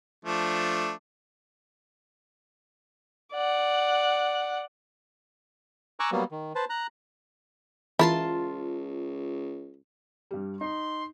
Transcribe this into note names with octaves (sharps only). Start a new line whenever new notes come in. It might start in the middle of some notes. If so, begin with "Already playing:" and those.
F3 A3 D4
D5 F#5
G#5 A#5 C#6 D6 E6 F#6
F#3 G3 A#3 B3
D#3
B4 C5 A5
A#5 F#6
C#2 E3 E4 F4 A#4 A5 C6
G2 G3
D#4 C6